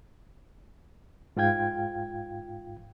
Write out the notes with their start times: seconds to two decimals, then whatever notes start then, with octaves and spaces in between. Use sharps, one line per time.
1.37 G#2 F4 F5 G5 G#6